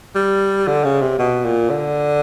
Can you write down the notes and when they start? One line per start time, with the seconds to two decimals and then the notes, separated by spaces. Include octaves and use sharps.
0.15 G3
0.68 D3
0.84 C#3
1.01 C3
1.19 B2
1.45 A#2
1.70 D3